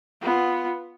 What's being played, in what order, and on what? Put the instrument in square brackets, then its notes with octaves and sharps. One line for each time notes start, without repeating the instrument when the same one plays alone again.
[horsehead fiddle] B3 F4